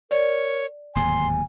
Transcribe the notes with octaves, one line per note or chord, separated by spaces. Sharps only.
A#4 C#5 D5
D1 D#2 G#2 G#5 C6